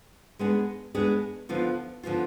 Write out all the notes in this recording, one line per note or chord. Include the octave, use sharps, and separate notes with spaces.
G#3 B3 D4 G#4
G#3 B3 D4 G#4
D3 F3 B3 F4
D3 F3 B3 F4